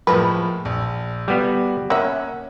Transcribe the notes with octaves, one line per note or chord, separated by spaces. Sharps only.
A2 F3 G#3 A#3 B4
A#1
G3 B3 F#4
A#3 C#4 E5 F#5